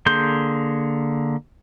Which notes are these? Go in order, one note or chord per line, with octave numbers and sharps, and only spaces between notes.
D3 A#3 G#4 C6 G6